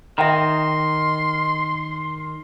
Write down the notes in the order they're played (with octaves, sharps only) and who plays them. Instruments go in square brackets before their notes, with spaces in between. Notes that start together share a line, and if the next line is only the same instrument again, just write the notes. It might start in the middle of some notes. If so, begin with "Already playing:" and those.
[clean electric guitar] D#3 [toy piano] E5 G5 A#5 [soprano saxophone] C6